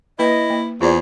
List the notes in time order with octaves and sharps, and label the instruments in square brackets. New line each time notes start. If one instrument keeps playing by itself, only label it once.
[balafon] A#3 B4 [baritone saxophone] E4 [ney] D#5
[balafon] A#3
[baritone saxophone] E2 [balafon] F4 C5 D5 [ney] G#4